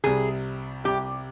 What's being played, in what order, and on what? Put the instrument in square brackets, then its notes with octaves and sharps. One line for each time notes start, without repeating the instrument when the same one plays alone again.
[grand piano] C2 C3 G3 [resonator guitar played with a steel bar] G#4
[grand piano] C2 C3 G3 [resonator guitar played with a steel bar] G4